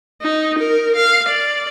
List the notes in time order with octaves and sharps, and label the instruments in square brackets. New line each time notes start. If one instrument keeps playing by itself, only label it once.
[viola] D#4
A#4
F5
D5